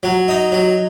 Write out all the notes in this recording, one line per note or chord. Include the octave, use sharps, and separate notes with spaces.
F#3
D#4
F#3